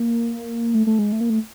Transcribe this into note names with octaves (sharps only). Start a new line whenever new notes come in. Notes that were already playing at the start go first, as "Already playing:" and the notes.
Already playing: A#3
A3
A3
G#3
A3
A#3
A3